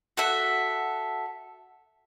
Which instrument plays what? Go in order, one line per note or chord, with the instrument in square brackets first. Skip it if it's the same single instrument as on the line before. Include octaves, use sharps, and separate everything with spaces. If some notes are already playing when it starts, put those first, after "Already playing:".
[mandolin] F#4 A4 E5